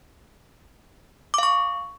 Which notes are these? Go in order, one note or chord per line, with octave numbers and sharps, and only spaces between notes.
F5 C#6 D6